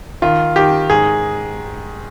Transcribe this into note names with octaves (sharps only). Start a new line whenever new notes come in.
D#3 F4
D#3 G4
G#2 G#4